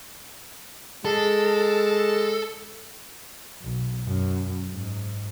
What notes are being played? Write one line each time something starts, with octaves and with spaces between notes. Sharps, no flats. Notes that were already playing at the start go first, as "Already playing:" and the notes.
G#3 A4
B1
F#2
G#2